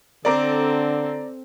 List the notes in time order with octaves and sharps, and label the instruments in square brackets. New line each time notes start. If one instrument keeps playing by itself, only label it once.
[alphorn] D3 [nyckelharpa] C4 A4 [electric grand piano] D5 A#5 D6